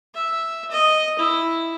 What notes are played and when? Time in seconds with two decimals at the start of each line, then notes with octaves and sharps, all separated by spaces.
0.15 E5
0.71 D#5
1.19 E4